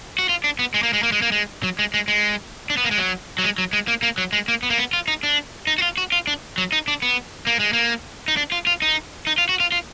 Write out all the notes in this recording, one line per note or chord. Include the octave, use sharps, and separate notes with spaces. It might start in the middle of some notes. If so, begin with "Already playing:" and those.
F#4
F4
D4
B3
G#3
A#3
G#3
A#3
G#3
A#3
G#3
F#3
G#3
G#3
G#3
D4
B3
A#3
G#3
F#3
F#3
G#3
F#3
G#3
A#3
A#3
F#3
G#3
A#3
B3
A#3
B3
F4
D#4
D4
D#4
F#4
F4
F#4
F4
D4
F#3
D#4
D4
B3
A#3
G#3
A#3
D#4
D4
F4
F4
D#4
D#4
F4
F#4
F4
F4